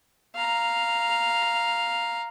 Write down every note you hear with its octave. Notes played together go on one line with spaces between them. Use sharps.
F5 A#5